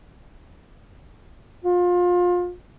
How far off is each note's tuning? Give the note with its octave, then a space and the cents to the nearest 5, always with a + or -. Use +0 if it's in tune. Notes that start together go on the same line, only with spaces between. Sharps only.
F4 +25